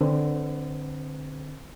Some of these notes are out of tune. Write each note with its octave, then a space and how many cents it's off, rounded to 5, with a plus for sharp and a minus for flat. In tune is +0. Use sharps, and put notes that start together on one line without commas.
D3 +20 C4 +20 B4 +40